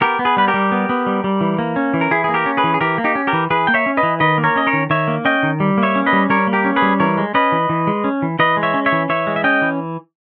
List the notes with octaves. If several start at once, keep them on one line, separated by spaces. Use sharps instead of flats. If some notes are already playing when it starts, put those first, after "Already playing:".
B3 G4 A#4
B3
G#4 B4
G3 B4
G4 A#4
G3
B3
B3
G3
G3
E3
A#3
C#4
E3
A#4
E3 E4 G#4
A#3 G#4
G4 A#4
C#4
G#4 B4
E3
G#4
E3 G4 A#4
A#3
D#4 G4
C#4
G4 A#4
E3
E3 G#4 B4
A#3 G5
C#5 E5
C#4
B4 D#5
E3
D#3 B4 D#5
A#3
A#4 C#5
C#4 D#5
A#4 C#5
D#3
D#3 C#5 E5
A#3
C#4 D#5 G5
D#3
G3
A#3
C#5 E5
C#4
B4 D#5
G3
G3 A#4 C#5
A#3
G4 A#4
C#4
G#4 B4
G3
E3 A#4 C#5
G#3
C#4 B4 D#5
E3
E3
G#3
C#4
E3
E3 B4 D#5
G#3
C#5 E5
C#4
C#5 E5
E3
E3 C#5 E5
G#3
E5
C#4 D#5 G5
E3